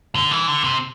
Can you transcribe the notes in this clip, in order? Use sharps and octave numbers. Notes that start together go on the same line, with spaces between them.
D3
E3
D3
C3